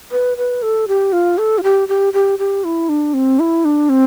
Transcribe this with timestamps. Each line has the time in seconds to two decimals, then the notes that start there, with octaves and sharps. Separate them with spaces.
0.12 B4
0.37 B4
0.62 A4
0.88 G4
1.13 F4
1.38 A4
1.58 F4
1.63 G4
1.88 G4
2.13 G4
2.39 G4
2.64 E4
2.89 D4
3.14 C4
3.39 E4
3.65 D4
3.89 C4